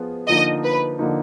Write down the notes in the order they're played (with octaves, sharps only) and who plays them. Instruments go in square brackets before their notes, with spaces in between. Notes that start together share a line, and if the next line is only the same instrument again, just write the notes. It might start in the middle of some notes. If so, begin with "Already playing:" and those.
Already playing: [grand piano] F3 B3 F4 G#4
[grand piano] D3 F3 A#3 D#4 [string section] D#5
[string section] B4
[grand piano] D3 F3 A#3 D#4